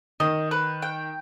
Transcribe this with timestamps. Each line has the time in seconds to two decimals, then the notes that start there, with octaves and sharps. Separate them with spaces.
0.20 D#3 D#5
0.51 B4
0.82 G5